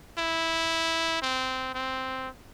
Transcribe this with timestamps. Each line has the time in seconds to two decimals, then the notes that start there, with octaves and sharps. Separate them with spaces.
0.18 E4
1.22 C4
1.74 C4